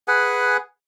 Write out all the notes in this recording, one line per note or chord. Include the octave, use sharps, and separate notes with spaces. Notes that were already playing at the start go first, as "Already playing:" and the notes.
G#4 B4 F#5 G#5